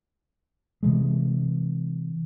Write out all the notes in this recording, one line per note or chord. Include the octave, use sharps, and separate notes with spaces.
C3 E3 G#3